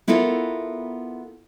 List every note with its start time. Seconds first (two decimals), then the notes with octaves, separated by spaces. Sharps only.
0.08 B3 E4 F4 A4 A#4